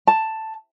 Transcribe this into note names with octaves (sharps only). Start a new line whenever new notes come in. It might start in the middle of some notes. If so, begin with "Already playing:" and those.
A5